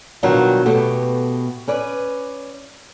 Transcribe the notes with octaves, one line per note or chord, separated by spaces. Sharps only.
B2 D#3 F#3 G3 D4 F4
B2 A3 B3 G4
C#4 B4 D5